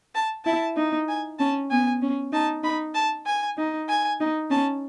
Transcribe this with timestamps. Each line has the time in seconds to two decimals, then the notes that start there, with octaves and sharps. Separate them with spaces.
0.15 A5
0.45 E4 A5
0.76 D#4
1.08 G#5
1.39 C#4 A5
1.70 B3 G#5
2.02 C#4
2.33 D#4 A5
2.63 D#4 B5
2.95 A5
3.26 G#5
3.58 D#4
3.89 G#5
4.20 D#4
4.50 C#4 A5